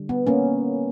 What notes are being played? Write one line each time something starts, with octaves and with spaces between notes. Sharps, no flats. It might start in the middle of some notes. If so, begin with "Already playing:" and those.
Already playing: D3 G3
B3
A#3 C#4